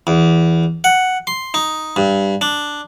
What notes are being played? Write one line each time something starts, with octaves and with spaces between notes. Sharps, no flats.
E2
F#5
C6
D#4
G2
D4